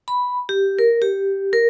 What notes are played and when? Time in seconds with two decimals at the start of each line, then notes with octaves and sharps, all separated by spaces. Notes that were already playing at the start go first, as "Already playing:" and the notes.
0.08 B5
0.49 G4
0.79 A#4
1.02 G4
1.53 A#4